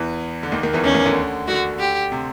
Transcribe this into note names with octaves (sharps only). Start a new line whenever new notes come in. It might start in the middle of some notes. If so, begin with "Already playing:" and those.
Already playing: E2 E3
D3
D#2 D#3
D#2 D#3
E2 E3
D#2 D#3 C#4
D#2 D#3
D2 D3
D2 D3 F#4
G4
C3